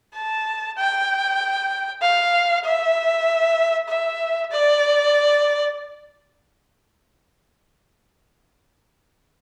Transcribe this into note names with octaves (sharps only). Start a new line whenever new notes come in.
A5
G5
F5
E5
E5
D5